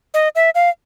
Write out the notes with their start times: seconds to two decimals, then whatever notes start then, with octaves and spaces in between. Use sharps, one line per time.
0.14 D#5
0.35 E5
0.55 F5